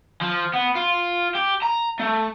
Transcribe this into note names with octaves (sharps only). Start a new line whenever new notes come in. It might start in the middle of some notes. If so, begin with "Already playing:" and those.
F3
B3
F4
G4
A#5
A3